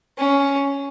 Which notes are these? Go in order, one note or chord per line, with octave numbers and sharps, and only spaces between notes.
C#4